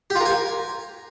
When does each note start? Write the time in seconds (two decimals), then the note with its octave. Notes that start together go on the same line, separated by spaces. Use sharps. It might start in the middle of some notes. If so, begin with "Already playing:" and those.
0.10 G4
0.15 F4
0.20 A#4
0.25 G#5